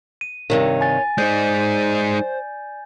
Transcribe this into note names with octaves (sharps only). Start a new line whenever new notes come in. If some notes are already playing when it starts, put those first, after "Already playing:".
D#7
G2 C3 D#3 C#5
G#5 A6
G#3 D#4 C5 D5 G6